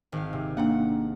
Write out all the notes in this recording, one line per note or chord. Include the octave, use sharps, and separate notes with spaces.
G#1 F5
C3
A#3 D4 F#5 G5